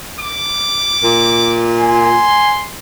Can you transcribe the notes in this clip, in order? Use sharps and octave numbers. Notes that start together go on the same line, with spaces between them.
D6
A#2
G#5 C6